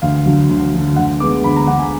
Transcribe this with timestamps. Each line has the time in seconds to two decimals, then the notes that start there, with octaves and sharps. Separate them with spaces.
0.02 D2 F5
0.26 D3 F#3
0.49 D2
0.74 D3 F#3
0.96 D2 F#5
1.20 D3 G#3 B3 D6
1.44 D2 B5
1.56 A#5
1.67 D3 G#3 B3 F#5
1.79 G#5